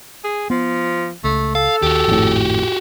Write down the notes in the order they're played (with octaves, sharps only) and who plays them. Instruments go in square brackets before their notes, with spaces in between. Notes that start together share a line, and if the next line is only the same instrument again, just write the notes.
[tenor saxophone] G#4
[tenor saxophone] F3 [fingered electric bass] B3
[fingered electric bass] C#2 [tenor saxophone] A3
[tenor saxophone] A4 [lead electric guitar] F5
[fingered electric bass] D#2 [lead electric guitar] F#4 G4
[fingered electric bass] G#1 [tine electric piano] F2 A2